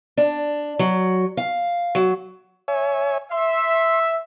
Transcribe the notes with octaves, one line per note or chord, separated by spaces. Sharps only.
D4
F#3
F5
F#3
C#5 E5 G#5
E5 C6